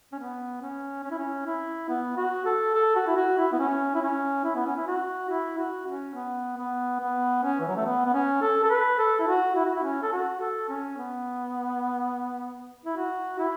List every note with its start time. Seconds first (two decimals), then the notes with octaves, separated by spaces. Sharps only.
0.12 C#4
0.19 B3
0.61 C#4
1.04 C#4
1.11 E4
1.18 C#4
1.46 E4
1.89 B3
2.17 F#4
2.46 A4
2.74 A4
2.96 F#4
3.07 E4
3.17 F#4
3.38 E4
3.53 B3
3.59 C#4
3.95 E4
4.02 C#4
4.44 E4
4.55 B3
4.66 C#4
4.76 E4
4.87 F#4
5.29 E4
5.58 F#4
5.87 C#4
6.14 B3
6.57 B3
7.00 B3
7.43 C#4
7.60 E3
7.68 F#3
7.77 A3
7.85 B3
8.06 B3
8.14 C#4
8.42 A4
8.64 A4
8.70 B4
8.99 A4
9.20 E4
9.27 F#4
9.56 E4
9.65 F#4
9.75 E4
9.84 C#4
10.03 A4
10.12 F#4
10.41 A4
10.69 C#4
10.98 B3
12.85 E4
12.96 F#4
13.39 E4